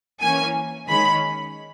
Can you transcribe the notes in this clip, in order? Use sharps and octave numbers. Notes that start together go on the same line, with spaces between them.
E3 A#3 C#4 G#5
D#3 G#3 C#4 B5